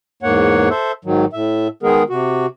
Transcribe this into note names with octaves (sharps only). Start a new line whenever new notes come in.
E2 G#2 A#3 C#5 F#5
A4 C5 E5
G#2 D#3 F#3
A2 E5
D#3 G#3 B3 G#4 A#4
C3 F#4